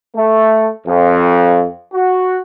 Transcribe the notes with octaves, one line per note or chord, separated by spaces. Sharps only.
A3
F2
F#4